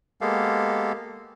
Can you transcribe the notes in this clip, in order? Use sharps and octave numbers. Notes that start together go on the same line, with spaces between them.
G#3 A#3 B3 G4 A4 F5